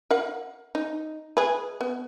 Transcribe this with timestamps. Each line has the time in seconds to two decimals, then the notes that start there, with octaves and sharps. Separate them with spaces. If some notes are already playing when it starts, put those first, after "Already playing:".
0.11 A#4 F5 F#5
0.75 D#4
1.37 G#3 G#4 B4
1.81 B3